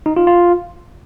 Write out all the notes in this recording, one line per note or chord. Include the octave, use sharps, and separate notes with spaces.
D#4
F4
F4